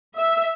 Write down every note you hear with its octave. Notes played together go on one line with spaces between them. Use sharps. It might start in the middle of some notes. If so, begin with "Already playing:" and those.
E5